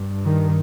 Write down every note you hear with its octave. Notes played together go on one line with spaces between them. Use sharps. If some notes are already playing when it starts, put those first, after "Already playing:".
Already playing: G2
D#3